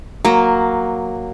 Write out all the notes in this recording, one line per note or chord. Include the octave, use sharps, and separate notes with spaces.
F#3 A#3